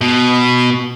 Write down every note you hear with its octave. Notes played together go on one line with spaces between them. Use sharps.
B2